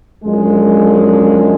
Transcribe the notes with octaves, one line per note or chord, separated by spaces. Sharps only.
F#2 D3 F3 G#3